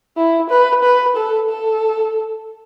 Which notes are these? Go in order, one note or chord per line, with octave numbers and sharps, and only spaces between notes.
E4
B4
B4
A4
A4